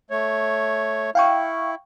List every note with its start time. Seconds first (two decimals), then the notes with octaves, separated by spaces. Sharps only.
0.11 A3 C#5
1.15 E4 F5 G5 C#6